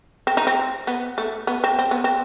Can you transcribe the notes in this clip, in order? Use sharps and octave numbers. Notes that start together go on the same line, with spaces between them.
C4
D#4
C4
B3
A3
B3
C4
C4
B3
C4